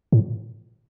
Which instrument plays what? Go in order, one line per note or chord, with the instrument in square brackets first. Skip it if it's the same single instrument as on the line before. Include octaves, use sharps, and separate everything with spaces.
[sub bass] A2